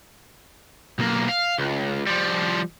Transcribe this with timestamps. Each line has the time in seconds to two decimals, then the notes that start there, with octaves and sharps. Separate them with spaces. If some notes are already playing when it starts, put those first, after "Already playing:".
0.99 B1 A#3
1.29 F5
1.59 C#2
2.07 F3 G3